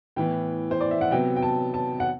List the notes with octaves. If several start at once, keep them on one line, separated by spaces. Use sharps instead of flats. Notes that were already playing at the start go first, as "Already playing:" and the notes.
A2 E3 B3 G5
C5
D5
E5
F#5
C3 F#3 B3 G5
G5
A5
A5
F#5